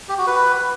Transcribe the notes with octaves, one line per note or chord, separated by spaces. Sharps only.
G4
F#4
B4